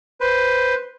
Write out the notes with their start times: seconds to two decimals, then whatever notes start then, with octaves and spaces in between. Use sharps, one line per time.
0.21 B4 C5